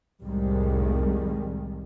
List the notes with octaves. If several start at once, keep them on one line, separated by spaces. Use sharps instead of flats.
C2 F2 A2 D#3 G3 G#3